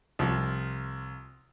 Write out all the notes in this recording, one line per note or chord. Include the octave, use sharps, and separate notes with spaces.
C2 F3